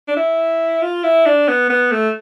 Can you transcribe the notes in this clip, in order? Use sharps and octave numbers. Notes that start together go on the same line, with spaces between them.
D4
E4
F4
E4
D4
B3
B3
A3